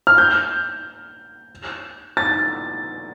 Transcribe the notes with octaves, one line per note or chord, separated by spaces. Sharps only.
F6
G6
A6